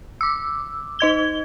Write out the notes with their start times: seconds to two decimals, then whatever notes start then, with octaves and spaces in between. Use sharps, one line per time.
0.21 D6 E6
0.99 D#4 D#5 G#6 G7